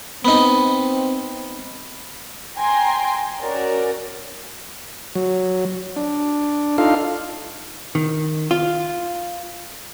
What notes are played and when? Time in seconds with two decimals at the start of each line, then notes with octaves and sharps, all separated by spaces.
0.25 B3 C4 D#4
2.58 G5 G#5 A#5 C6
3.41 C#4 F#4 A#4 D5
5.15 F#3
5.96 D4
6.78 D4 D#4 F4 A4 F5
7.95 D#3
8.51 F4